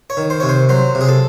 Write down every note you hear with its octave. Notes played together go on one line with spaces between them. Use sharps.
C#5
D#3
C5
C3 C#5
C5
F#3 C5
C3
G#4
A4